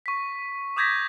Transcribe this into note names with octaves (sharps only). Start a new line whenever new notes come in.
C#6 B6
D6 D#6 G6 G#6 A#6 B6